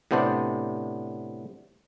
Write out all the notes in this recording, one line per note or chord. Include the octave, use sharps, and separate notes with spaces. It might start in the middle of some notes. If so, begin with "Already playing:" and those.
A2 C3 B3 D4 C5 D5